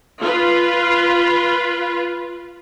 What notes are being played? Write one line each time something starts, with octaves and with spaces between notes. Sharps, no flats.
F4 B4